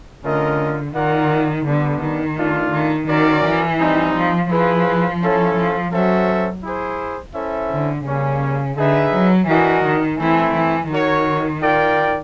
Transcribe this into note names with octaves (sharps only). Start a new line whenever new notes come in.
D3 A3 C#4 F4 A#4 D#5
D#3 F4 A#4 D5 F#5
D3 G3 B3 D4
D#3
A3 D4 F4
D#3
D#3 C#4 F#4 A#4 D5
E3
G3 C4 D#4
F3
F3 E4 G#4 B4
C#4 E4 A4 C#5
F3
F#3 C#4 F#4 A4 C5 E5
E4 G#4 C5
C#4 E4 A4 C5 E5
D3
C#3 G3 A#3 C#4
D3 D#4 G#4 B4 E5
F#3
E3 D4 F#4 A#4 D#5
D#3
E3 A3 C4 E4
E3
D#3 F#4 A#4 C#5
F4 A#4 D5 G5